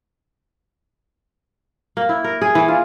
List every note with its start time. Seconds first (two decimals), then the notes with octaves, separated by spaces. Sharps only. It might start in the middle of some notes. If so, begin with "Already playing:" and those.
1.97 A#3
2.09 E4
2.24 A#4
2.41 G#4
2.55 E3
2.68 F4